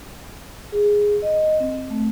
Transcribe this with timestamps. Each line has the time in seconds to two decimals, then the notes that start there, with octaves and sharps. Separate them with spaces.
0.72 G#4
1.22 D#5
1.60 C4
1.90 A3